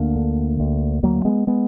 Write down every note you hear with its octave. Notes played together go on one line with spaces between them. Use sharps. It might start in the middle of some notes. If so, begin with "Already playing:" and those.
Already playing: D2 A#3 D4
D3
D2
D2 F#3 A#3
G#3 B3
G#3 B3